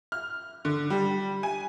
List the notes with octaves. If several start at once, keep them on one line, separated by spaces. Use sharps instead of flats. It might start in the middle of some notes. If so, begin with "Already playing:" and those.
F6
D3
G3
G#5